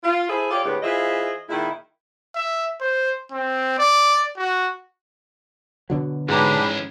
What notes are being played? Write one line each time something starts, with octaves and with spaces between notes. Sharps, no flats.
F4
E4 G#4 A4 C5 E5
F4 G4 A4 C#5 D5
D2 A2 G#3 B3 G4
E3 F4 G#4 C5 D#5 E5
A#2 D#3 G#3 E4
E5
C5
C4
D5
F#4
B2 D3 F#3
G#2 E3 C#4 D4 G4 B4 A#5